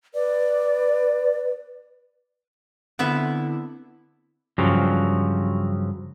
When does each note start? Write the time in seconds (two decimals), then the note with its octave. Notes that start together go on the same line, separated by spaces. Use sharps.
0.14 B4 D5
2.99 D3 B3 C4 E4 A4 E5 F#5
4.58 G2 C#3 F3 F#3